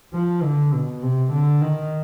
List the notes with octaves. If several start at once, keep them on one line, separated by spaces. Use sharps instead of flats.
F3
D3
B2
C3
D3
D#3